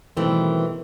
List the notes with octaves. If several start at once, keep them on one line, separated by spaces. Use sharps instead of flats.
B2 D#3 E3 G3 A3 C4